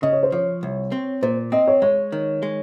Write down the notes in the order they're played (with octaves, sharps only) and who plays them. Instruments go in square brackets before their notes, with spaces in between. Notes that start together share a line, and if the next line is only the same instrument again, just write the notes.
[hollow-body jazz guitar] C#3 [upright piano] D#5
[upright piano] C#5
C5
[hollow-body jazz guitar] F3 [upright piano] C#5
[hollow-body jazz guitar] C2
C4
[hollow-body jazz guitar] A#2 [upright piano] C5
[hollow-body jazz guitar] C4 [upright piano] D#5
[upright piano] C#5
[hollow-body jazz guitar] G#3 [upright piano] C#5
[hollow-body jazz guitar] D#3
G#3